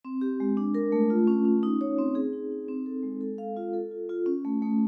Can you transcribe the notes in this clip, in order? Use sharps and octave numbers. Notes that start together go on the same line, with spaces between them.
C4
G4
G#3
D4
A#4
A3
F4
C#4
C#4
D#4
C#5
C4
G#4
D#4
D#4
C4
A4
G#3
A4
F5
F4
A4
F4
F4
C#4
A3
A3